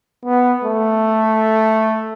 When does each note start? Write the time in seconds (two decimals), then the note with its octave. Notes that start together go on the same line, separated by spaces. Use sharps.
0.25 B3
0.65 A3